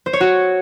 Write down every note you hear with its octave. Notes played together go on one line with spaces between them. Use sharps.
C5
C#5
F#4